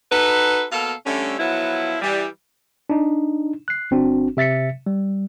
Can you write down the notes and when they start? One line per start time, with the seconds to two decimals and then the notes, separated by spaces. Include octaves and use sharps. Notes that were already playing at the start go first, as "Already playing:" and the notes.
0.11 D#4 F#4 A4 B4
0.71 B2 A#3 A4 F5
1.05 D3 G3 A3 C#4
1.39 F3 F#3 B3 E4
2.02 E3 G3
2.90 D4 D#4
3.68 F#6 C7
3.91 G1 C4 D4 F#4
4.37 C3 E5 A6 B6 C#7
4.86 G3